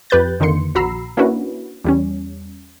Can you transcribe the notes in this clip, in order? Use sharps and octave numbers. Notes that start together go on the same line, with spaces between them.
F2 G4 B4 F#6 G6 A6
F2 D3 D#3 A#3 C6 C#7
A#1 F#4 A#5 B5 E6 C7
A#3 C#4 D4 E4 F#4 B4
E2 G3 C#4